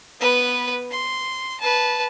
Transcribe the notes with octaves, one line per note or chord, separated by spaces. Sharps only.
B3 B4
C6
B4 A5